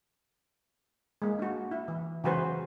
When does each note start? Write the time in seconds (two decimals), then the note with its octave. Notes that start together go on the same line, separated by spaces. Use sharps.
1.22 G#3 A#3
1.39 D4 F#4
1.71 E4
1.88 E3
2.24 C#3 E3 F#3 F#4 B4 C5